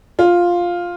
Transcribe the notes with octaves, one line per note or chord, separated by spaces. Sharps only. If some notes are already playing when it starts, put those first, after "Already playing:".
F4